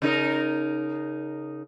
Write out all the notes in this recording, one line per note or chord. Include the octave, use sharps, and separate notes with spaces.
C#3 D#4 A#4